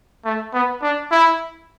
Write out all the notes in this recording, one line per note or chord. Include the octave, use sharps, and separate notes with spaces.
A3
B3
D4
E4